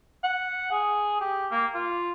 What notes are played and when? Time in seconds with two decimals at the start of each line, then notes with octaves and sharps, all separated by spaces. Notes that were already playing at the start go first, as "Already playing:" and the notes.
0.24 F#5
0.71 G#4
1.21 G4
1.51 A#3
1.74 F4